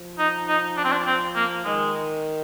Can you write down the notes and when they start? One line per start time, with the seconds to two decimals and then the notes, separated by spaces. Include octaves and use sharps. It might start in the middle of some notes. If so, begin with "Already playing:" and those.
Already playing: F3
0.19 D#4
0.48 D#4
0.77 D4
0.84 C4
0.92 D4
1.06 C4
1.35 A#3
1.65 D#3 G#3